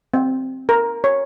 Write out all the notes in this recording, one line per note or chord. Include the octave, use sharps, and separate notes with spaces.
C4
A#4
C#5